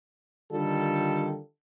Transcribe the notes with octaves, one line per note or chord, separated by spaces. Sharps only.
D3 D#3 G3 F4 A4